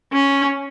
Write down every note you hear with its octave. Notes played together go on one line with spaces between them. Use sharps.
C#4